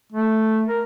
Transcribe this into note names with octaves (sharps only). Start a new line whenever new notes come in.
A3
A#4